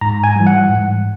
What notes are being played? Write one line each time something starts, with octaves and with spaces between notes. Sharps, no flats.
G#2 A#5
G#5
E3 G3
F#5
G#2